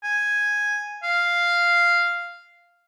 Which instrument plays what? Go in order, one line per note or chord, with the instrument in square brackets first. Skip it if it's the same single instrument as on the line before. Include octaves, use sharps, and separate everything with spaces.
[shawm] G#5
F5